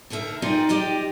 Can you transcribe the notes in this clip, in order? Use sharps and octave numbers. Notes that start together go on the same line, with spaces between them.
D#2 D3 A#4 E5
D#4 F4 G#4 A#4 D5 G5
G4 D5 D#5 G5